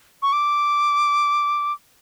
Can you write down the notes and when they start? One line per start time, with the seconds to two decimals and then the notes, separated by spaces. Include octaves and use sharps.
0.23 C#6
0.33 D6